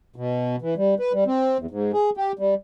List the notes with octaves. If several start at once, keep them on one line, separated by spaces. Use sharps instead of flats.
B2
E3
G3
B4
G3
C4
E2
G#2
G#4
G4
G3